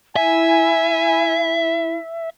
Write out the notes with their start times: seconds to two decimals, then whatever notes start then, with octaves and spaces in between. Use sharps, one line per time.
0.16 E4 E5 G#5